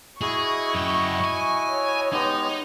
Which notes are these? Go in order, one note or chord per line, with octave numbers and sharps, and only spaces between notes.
E4 F#4 G#4 D#5 C#6
F#2 G5
G#5
C#5
G#3 B3 D#4 G4